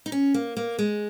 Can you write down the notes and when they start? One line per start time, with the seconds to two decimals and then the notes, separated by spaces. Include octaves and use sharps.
0.06 D#4
0.12 C#4
0.34 A#3
0.57 A#3
0.79 G#3